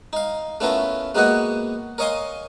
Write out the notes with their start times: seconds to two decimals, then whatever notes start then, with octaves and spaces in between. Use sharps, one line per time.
0.13 D#4 F5
0.60 A3 B3 C#4 E4 F4 A#4
1.15 G#3 A#3 B3 F#4 D#5 F#5
1.98 A#4 C#5 D#5 F5 G#5 C6